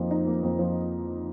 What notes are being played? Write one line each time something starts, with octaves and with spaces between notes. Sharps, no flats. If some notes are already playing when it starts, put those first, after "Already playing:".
Already playing: F2 F3 A#3 D#4
D#4
A#3
F2
F3